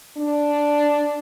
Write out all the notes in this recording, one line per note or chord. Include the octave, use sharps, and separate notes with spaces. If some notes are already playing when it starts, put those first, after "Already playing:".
D4